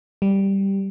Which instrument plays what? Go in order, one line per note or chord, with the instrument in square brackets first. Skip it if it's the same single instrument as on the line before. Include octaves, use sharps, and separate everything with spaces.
[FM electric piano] G3